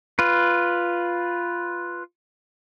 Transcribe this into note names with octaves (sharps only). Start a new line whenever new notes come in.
F4 B4